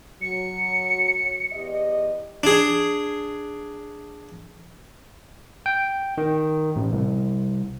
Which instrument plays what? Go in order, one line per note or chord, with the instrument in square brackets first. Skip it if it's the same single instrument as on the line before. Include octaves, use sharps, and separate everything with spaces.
[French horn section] F#3 [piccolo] C#7
[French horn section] E2 G4 D#5
[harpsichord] D4 G#4
[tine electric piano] G5
D#3
A1
C2